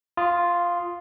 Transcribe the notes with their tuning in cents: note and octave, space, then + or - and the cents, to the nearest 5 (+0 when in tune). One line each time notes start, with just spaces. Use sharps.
F4 +0 C6 -30 D#6 +0